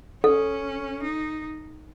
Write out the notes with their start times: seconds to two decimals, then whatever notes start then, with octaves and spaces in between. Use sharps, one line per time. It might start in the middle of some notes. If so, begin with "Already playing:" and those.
0.24 C#4 A4
1.03 D#4